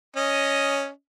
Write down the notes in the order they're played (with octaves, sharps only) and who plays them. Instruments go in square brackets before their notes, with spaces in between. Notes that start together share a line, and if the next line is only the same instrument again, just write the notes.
[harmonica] C#4 D#5